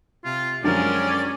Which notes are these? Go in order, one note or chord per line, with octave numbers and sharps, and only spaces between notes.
C3 F4
F#2 D3 F3 G#3 C#4 G4 A#4 D5